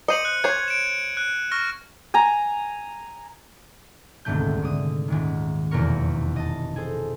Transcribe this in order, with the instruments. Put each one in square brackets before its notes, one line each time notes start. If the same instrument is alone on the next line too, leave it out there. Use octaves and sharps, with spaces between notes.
[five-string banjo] C5 D#5 [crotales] C#7 D#7 F#7
[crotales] F#6
[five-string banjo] C5 C#5 [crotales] G#6
[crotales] D7 E7
F#6
C#6 F6 A#6
[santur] G#5 A#5
[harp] D#1 C2 G#2 D3 A3 G6
G#2 D3 D#6
D#1 G#2 D#3
F1 E2 B2 A#3 A#4 C#6
D#5 A5
G#4 A4 C5